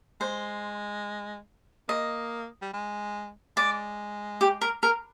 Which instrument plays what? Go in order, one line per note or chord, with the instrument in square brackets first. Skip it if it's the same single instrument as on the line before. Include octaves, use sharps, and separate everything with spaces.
[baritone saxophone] G#3 [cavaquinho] C5
[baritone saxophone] A#3 [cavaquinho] D#5
[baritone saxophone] G3
G#3
[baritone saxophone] G#3 [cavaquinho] D5
[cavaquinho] G4
A#4
A#4